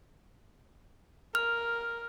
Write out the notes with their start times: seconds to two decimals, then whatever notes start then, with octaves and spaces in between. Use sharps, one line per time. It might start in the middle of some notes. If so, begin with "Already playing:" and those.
1.35 A#4 F6